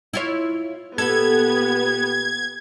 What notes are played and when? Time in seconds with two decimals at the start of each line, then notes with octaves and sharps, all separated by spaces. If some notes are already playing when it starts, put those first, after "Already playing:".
0.13 E4 F4 C#5
0.98 A#2 B3 G4 A4 G#6